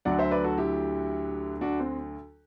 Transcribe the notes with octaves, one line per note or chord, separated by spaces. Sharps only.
D2 D3 F#3 D5 F#5
C5 E5
B4 D5
F#4 A4
E4 G4
D4 F#4
C4